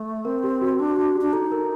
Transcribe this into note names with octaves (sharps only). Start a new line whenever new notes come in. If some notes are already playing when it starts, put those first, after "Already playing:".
Already playing: A3
C4 A#4
G4
F#4
D4 F#4
F#4
G4
D4
D#4 A4
A#4